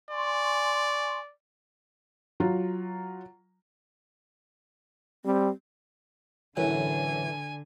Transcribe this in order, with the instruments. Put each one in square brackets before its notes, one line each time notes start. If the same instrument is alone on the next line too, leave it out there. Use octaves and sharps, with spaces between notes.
[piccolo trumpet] D5 [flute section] G#5 C6 C#6
[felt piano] F#3 F4
[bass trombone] G3 [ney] C4
[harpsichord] F#2 A2 [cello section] D3 [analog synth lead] E3 [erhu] G#5